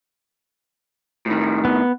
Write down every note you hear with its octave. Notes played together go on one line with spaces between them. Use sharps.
A2 D#3
B3